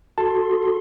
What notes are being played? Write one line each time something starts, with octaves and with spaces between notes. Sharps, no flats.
F#4 A4 A5 C6